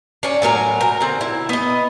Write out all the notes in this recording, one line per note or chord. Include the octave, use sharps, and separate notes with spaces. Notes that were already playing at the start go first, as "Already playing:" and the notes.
C#4 D4
A2 F#3 A#4 G#5
A#4
D3 C4
E4
B3 D#5